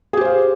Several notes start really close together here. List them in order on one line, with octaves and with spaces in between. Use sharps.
G#4 G4 C5 F5